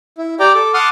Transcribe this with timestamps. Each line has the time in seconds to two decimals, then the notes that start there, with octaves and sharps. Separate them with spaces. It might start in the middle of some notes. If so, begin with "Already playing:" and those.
0.18 E4
0.40 G4 D5 G5 A#5 D6
0.55 A4 D6
0.74 F#5 A5 C6 D6 D#6 F6